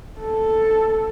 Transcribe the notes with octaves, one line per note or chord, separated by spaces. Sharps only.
A4